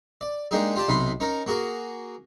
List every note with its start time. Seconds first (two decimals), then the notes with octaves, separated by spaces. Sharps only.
0.21 D5
0.51 G#3 A#3 D4 D#4 G4 G#4
0.75 F4 G4 D5 A5
0.88 B1 C3 D#4 B5 C6
1.20 C#4 D#4 A#4
1.47 A#3 F#4 G#4 A#4